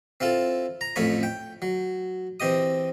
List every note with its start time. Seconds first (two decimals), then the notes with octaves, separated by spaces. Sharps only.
0.20 C4 E4 F4 A4
0.81 A#5
0.96 A1 F2 A3 C#4 C#5 B5
1.23 G5
1.62 F#3
2.40 E3 C4 G4 D#5 D#6